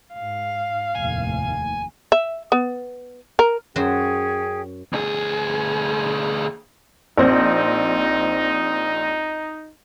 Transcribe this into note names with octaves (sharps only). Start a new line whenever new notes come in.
G#2 F5
F1 D#2 A2 G#5
E5
B3
A#4
F#2 C#4 F#4 G#4 C5 G5
D2 G#4
A#1 C4 D#4 G6